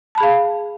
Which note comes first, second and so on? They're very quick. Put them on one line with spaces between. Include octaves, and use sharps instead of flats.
A5 B5 G#4 F5